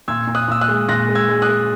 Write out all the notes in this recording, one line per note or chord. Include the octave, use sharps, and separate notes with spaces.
A#2 E6 G#6
A#2
D#6 F#6
A#2 E6
D#6 F#6
G#3
A#2 F#6 A#6
G#3
E6 G#6
G#3
D#6 F#6
G#3